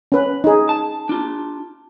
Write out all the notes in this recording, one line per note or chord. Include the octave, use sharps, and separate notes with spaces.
C#4 B4
D#4 G#4
A5
D4 F4